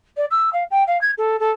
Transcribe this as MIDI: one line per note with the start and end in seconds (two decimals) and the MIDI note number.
0.17 0.25 74
0.30 0.49 88
0.53 0.64 77
0.70 0.83 79
0.87 0.99 77
1.01 1.11 92
1.17 1.39 69
1.39 1.51 69